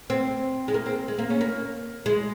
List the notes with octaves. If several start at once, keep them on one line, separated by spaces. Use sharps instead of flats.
C4
G#3
A#3
C4
G#3
A#3
C#4
A#3
G#3